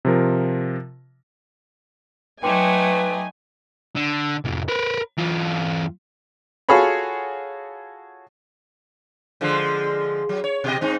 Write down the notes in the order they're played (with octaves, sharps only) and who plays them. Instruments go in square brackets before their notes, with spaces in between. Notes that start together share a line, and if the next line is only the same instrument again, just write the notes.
[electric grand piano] C3 F3 A#4
[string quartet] F#3 A3 [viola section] D#4 G#5 [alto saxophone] B4 [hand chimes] G5 C6 D6
[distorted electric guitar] D3
C2 F2
A#4 B4
E2 F4
[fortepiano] F4 F#4 G#4 A4 C#5 B5
[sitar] D3 F3 G#3
F#3
C#5
B2 G4 D#5
G#2 C4 D#4